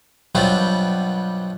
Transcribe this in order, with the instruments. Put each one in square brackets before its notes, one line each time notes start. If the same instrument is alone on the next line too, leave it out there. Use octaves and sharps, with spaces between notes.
[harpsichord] G2 B2 F#3 G3 C4 F4